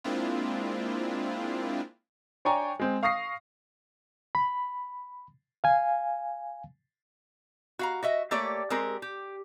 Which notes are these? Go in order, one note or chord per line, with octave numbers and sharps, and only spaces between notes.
G#3 A#3 C4 D4 E4 F4
D4 C#5 G5 G#5 A#5 C#6
G#3 C4
F5 C#6 D#6 A#6 C7
B5
F5 G#5
F#4 F5 A#5
F#4 D#5 E5
A3 A#3 G4 C#5 D5
G#3 C4 G4 A#4
G4